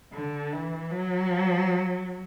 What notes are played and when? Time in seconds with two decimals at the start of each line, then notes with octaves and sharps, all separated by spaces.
0.12 D3
0.52 E3
0.91 F#3